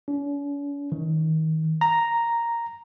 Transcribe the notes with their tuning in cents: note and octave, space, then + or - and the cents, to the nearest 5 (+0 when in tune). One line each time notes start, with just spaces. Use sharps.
C#4 +45
D#3 +30
A#5 +0